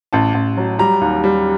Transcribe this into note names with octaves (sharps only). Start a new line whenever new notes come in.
A1 A5
A1
F#3
G3 A#5
D#2
G3